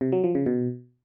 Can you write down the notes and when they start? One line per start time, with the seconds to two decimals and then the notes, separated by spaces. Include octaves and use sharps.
0.01 C3
0.12 F#3
0.24 F3
0.35 C#3
0.46 B2